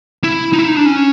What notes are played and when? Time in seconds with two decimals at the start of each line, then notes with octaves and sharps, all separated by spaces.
0.24 E4
0.53 D#4
0.59 E4
0.68 D#4
0.77 D4
0.86 C#4